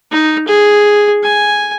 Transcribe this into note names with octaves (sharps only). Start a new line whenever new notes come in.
D#4
G#4
G#5